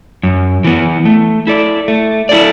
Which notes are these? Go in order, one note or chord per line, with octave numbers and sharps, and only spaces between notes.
F#2
E3 B3
A3
E4 A4 D5
A3
E4 A4 D5